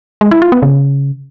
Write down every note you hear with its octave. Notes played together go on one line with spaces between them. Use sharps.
G#3
E4
F4
B3
C#3